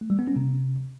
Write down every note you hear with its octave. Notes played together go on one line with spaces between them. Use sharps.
A3
G3
B3
C#4
C3